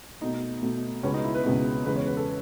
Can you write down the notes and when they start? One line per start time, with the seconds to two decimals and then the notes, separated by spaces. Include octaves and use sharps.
0.21 B2 A3 D#4
0.62 B2 A3
1.03 C#2 B2 G#3 B3 C#4
1.14 D#4
1.24 E4
1.34 B4
1.44 C#2 B2 G#3 B3
1.85 E2 C#3 G#3 B4
1.96 C#5
2.06 B4
2.17 A4